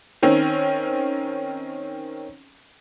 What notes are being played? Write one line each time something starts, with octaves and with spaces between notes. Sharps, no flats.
D#3 C4 C#4